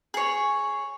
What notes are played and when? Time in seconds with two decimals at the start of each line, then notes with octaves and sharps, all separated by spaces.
0.14 G#4 C#5